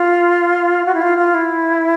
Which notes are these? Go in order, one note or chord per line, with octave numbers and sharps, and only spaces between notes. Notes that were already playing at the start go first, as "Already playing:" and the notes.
Already playing: F4
F#4
E4
F4
F4
E4